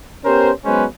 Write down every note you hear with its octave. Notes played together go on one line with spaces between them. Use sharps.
B3 C#4 G4 A#4 C5
F#3 G#3 B3 C#4 B4 C5